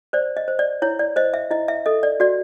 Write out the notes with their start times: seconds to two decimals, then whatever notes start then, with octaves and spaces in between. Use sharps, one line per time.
0.13 C5 D5
0.37 D#5
0.48 C5
0.59 D5
0.82 E4 C#5
0.99 D5
1.16 C5 D#5
1.34 E5
1.51 E4 D#5
1.68 E5
1.86 A4 D#5
2.03 D5
2.20 F#4 D5